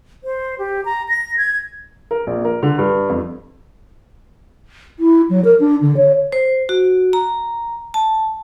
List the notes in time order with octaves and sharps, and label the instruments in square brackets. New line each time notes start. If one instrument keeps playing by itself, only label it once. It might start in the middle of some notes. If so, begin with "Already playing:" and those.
[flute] C5
G4
A#5
A#6
G#6
[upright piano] A#4
A#1
A#4
D3
G2
F2
[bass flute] E4
F#3
A#4
D4
D3
C#5
[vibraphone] C5
F#4
A#5
A5